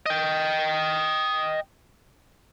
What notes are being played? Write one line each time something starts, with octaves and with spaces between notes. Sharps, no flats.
D#5 G5